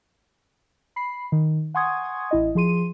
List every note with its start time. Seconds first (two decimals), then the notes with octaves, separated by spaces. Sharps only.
0.96 B5 C7
1.32 D#3
1.74 F#5 G#5 C6 C#6 D#6 G#6
2.31 A1 E4 D#5
2.55 F3 G#4 C6 D#7